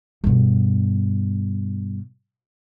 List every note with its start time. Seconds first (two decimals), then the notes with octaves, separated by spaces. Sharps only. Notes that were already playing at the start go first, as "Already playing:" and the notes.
0.24 G2 B2